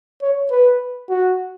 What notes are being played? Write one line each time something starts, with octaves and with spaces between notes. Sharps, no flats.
C#5
B4
F#4